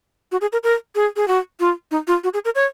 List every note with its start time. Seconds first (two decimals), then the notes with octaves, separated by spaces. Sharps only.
0.32 F#4
0.41 G#4
0.53 A#4
0.64 A#4
0.95 G#4
1.16 G#4
1.28 F#4
1.60 F4
1.91 D#4
2.07 F4
2.24 F#4
2.34 G#4
2.45 A#4
2.55 C#5